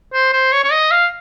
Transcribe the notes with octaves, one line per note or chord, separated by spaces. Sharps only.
C5
C5
C#5
C#5
D#5
F5